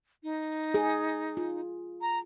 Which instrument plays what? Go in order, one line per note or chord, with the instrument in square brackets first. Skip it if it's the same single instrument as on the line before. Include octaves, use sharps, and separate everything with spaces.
[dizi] D#4
[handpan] G#4
F4
[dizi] A#5